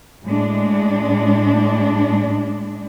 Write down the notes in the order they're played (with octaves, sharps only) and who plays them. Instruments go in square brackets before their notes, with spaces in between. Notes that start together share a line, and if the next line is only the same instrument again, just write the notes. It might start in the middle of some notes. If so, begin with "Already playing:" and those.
[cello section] A2 G#3 D4